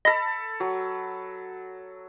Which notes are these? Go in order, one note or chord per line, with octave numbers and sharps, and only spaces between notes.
A4 D#5 B5 A#6
F#3